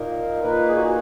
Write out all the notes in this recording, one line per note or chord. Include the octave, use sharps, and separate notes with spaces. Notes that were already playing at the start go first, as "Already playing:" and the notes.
Already playing: A#2 A#3 D#4 A#4
A#2 A#3 D#4 B4
G#4
F#4
G#4